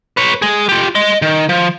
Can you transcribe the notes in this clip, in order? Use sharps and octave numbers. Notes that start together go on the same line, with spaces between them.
B4 C#5
G#3 G#4
F4 G4
D#5 C6
D#3
F3